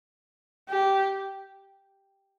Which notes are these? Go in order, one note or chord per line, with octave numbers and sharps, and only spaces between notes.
G4